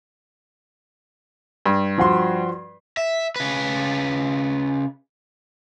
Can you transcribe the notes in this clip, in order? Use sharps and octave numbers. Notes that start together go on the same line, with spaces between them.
G2
F3 F#4 C6
E5
C#3 B4